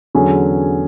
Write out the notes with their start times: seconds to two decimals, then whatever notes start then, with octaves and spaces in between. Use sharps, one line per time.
0.15 E2 D3 F#3 C#4 G#4